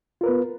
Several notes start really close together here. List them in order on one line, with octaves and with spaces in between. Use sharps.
F4 A#4 B4 B3